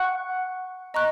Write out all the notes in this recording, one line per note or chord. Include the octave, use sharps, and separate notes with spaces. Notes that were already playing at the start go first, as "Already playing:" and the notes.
Already playing: F#5 C#6 F#6
D#5 A#5 C#6 F#6